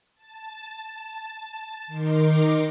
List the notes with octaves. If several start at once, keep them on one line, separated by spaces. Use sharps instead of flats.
A5
D#3 D#4 A#4 C6 D6